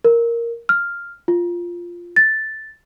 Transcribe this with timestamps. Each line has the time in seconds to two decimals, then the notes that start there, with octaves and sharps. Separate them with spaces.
0.05 A#4
0.69 F6
1.28 F4
2.16 A6